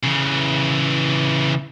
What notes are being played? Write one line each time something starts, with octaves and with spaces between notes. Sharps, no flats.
C#3 E3